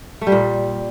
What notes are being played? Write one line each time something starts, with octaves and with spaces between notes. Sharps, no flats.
A3
G3
A#2